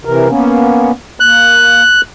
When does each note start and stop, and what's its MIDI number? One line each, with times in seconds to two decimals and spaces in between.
0.05 0.28 48
0.05 0.28 52
0.05 0.28 70
0.28 0.91 58
0.28 0.91 59
0.28 0.91 61
1.20 1.82 58
1.20 2.01 90